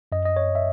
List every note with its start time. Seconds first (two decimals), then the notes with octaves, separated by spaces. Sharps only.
0.12 F#2 D#5
0.25 D#5
0.36 C#5
0.55 E5